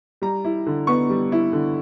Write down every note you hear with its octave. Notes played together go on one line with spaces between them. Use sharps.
G3 A#5
E4
D3
B3 C#6
G3
E4
D3